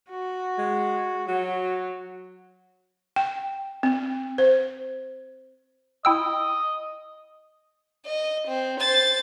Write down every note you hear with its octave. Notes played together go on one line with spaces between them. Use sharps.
F#4
G#3
F#3 F#4
G5
C4
C5
E4 D#5 G5 E6
D#5
C4
C5 A6